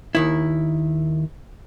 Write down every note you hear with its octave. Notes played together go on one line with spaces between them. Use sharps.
D#2 D#3 E4